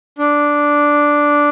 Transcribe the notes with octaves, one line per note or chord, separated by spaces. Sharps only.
D4